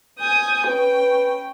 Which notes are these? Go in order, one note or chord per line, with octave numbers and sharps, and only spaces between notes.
G#5 D#6 G6
C#4 B4 G5